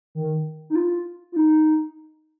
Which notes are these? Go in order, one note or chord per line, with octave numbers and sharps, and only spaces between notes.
D#3
D#4
F4
F4
D#4